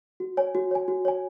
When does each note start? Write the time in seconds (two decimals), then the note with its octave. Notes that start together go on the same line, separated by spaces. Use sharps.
0.20 F#4
0.37 C#5 G#5
0.55 F#4
0.71 C#5 G#5
0.88 F#4
1.05 C#5 G#5